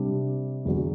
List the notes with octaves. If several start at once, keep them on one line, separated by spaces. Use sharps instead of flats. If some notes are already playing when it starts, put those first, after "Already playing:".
Already playing: C3 G3 D4 G4
E2 D3 F#3